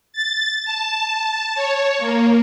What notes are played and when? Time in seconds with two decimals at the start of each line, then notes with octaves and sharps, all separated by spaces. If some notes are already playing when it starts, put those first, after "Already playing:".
0.13 A6
0.65 A5
1.55 C#5
1.99 A#3